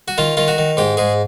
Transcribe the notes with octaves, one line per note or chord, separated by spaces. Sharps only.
F#4
D#3 F4
D#3 F4
F#4
D#3
G#2 G4
G#2 G#4